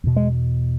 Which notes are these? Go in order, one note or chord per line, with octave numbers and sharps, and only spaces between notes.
E2 B2
G#3